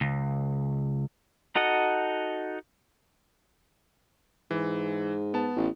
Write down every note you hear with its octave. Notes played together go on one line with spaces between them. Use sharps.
C#2
D#4 F#4 A4 D#5 F#5
G#2 E3
B3 A5
A1